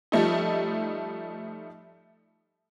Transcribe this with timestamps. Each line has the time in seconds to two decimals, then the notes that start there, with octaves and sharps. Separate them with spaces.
0.12 F3 G3 A3 D#4